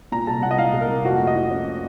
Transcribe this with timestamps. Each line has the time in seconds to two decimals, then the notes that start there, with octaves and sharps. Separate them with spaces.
0.12 A#2 A#5
0.27 C2 A5
0.43 A#2 F#5
0.51 D#5
0.58 A#2 F5
0.74 C2
0.81 A#4
0.89 A#3
1.04 F2 F#4
1.20 A3
1.27 D#5
1.35 F2
1.51 C#4